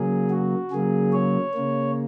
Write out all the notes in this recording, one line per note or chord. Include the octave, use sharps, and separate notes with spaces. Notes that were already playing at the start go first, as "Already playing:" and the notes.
Already playing: C#3 F#3 A#3 G#4
F#4
C#3 F#3 A#3 G#4
C#5
C#3 A#3